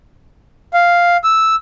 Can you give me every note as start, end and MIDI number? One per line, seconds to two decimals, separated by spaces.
0.74 1.17 77
1.24 1.55 88